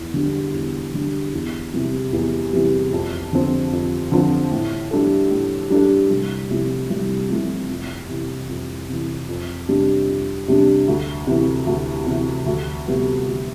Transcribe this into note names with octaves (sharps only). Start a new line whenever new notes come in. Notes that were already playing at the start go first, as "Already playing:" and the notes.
Already playing: E2
D3 G3 D4
E2
D3 G3 D4
E2
C3 E3 G3
E2
C3 E3 G3
F2
D3 F3 C4
F2
D3 F3 C4
A2
G3 D4 A4
A2
G3 D4 A4
C2
C3 F3 A3 E4
C2
C3 F3 A3 E4
F2
C3 E3
F2
C3 E3
F2
C3 G3 D4
F2
C3 G3 D4
D2
C3 E3
D2
C3 E3
D2
C3 G3 B3
D2